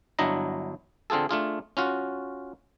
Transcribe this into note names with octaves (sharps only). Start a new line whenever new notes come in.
G1 F#3 D4 E4 D#5 A#5
D3 C4 F4 G#4 A4
A3 D4 F4 G#4
C#4 F4 F#4